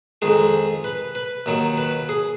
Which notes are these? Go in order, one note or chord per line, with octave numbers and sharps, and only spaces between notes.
F2 D#3 G#3 G#4
B4
B4
D#2 D#3 F#3
B4
G#4